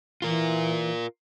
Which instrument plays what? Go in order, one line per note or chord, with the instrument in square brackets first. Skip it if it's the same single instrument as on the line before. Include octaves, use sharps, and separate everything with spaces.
[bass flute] E3 [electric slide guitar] F4 A#4